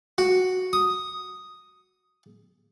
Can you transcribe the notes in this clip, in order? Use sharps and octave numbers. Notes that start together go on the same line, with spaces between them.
F#4
D#6